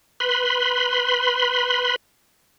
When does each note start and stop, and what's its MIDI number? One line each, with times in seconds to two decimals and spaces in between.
0.20 1.96 71
0.20 1.96 83
0.20 1.96 84